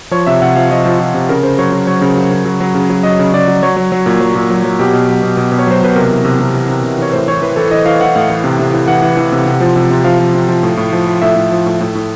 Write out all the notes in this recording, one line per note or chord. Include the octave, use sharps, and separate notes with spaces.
F3 C#5
C3 E5
C3 F#5
F3 F5
F3 D#5
F3
F3
C3
C#3 A#4
C#3 C5
F#3 C#5
F#3
F#3 C#5
C#3
F#3
C#3
F#3
F#3
C#3
F#3
F#3 D#5
C#3
C#3 D5
F#3
F#3 C#5
F#3
F#3
A#2
F#3
A#2
F#3
F#3
B2 G4
B2
F#3
B2
B2
B2
C#5
F#3 C5
B2 B4
C3 A#4
E3
C3
C3
E3
C3
C3
E3 C#5
A2 C5
E3 C#5
E3 B4
E3 A4
E3 D#5
E3 F5
E3 F#5
A2 F5
E3
C3
C3
E3
E3 F#5
E3
E3
C3
C3
F3
C3
C3
F3 F5
F3
C3
F3
A2
A2
F3
F3
A2 E5
A2
F3
A2
A2
A2